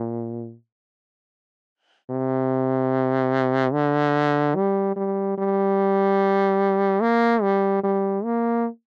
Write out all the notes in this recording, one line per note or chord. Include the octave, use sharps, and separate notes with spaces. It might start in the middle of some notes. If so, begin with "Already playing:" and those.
Already playing: A#2
C3
D3
G3
G3
G3
A#3
G3
G3
A#3